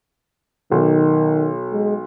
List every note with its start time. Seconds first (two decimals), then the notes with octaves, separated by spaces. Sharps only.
0.71 B1 D#3
1.73 G#3